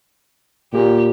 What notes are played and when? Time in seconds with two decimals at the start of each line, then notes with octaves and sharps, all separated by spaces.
0.73 A#2 G4